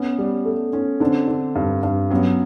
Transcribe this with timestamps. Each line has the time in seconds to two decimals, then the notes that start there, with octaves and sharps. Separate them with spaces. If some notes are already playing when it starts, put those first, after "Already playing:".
Already playing: B3 C#4
0.19 G3
0.45 A3
0.73 C#4
1.00 D3 C4 D4
1.28 D3
1.55 G2
1.83 G2
2.10 F#3 B3 C#4